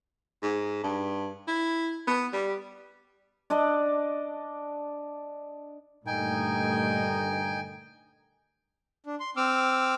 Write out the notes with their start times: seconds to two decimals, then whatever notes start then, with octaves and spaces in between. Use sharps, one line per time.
0.42 G#2
0.83 G2
1.47 E4
2.07 B3
2.33 G3
3.50 D4 D5 D#5
6.07 G2 A#2 D3 D#3 A3 D#4 G5 G#5
9.06 D4
9.20 C6
9.37 C4 D6 E6 F6